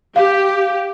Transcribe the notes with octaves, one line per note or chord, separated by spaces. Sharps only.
G4 F5